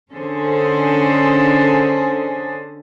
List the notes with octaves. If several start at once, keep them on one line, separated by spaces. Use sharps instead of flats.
D3 C#4 D4 G#4 A4 C5